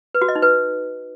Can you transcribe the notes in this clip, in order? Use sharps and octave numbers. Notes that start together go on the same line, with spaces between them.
B4
F#4
D#5
D#4
B4